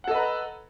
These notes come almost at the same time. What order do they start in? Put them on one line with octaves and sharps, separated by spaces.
F#5 A4 D#5 B4 A#5